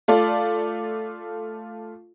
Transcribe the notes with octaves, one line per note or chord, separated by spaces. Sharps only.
A3 F4 A4 D5